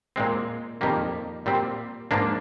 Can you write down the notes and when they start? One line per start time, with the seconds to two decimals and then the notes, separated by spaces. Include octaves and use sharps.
0.16 A#2 G#3 C4
0.81 F2 D#3 G3 A#3
1.46 A#2 G3 C4
2.11 G#2 F3 A#3 D4